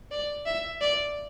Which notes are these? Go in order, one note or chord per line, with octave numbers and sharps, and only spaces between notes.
D5
E5
D5